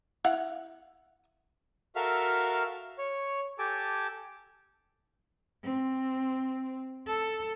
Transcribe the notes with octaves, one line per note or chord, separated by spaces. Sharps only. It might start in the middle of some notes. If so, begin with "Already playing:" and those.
E4 F5 F#5
F#4 A4 A#4 E5 F5 F6
C#5
G4 A4 G#5 A5 D6
C4
A4